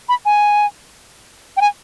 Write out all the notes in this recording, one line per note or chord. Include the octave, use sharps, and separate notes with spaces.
B5
G#5
G5
G#5